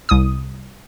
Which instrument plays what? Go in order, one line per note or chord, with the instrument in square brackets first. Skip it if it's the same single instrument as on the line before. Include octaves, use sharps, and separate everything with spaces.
[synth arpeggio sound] C2 D#6